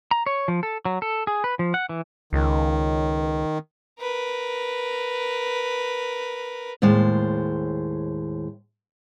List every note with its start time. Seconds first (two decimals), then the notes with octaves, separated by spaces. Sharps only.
0.11 A#5
0.26 C#5
0.48 F3
0.63 A4
0.85 F#3
1.02 A4
1.27 G#4
1.44 B4
1.59 F3
1.74 F#5
1.89 E3
2.33 C#2 D#3
4.00 A#4 B4
6.82 D#2 A2 G#3 C5